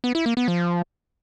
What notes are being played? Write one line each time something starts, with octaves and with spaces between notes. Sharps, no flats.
B3
E4
A#3
B3
F3